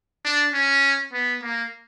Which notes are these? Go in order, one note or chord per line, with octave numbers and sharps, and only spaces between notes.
D4
C#4
B3
A#3